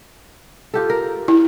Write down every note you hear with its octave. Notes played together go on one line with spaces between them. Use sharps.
F4 G4 A4
A#4
E4